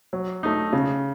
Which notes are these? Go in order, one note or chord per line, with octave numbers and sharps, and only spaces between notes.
F#3
A3 D#4
C#3